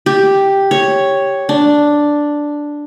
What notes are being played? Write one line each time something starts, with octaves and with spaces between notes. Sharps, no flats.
G4
C#5
D4